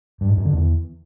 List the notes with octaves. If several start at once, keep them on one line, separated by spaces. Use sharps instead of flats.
G2
G#2
F#2
D3
E2